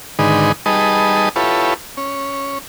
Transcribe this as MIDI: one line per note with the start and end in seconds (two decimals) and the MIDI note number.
0.19 0.52 44
0.19 0.52 50
0.19 0.52 51
0.19 0.52 63
0.19 0.52 68
0.19 0.52 71
0.66 1.29 55
0.66 1.29 63
0.66 1.29 68
0.66 1.29 71
0.66 1.29 75
0.66 1.29 81
1.36 1.74 64
1.36 1.74 65
1.36 1.74 67
1.36 1.74 69
1.36 1.74 71
1.36 1.74 73
1.97 2.58 61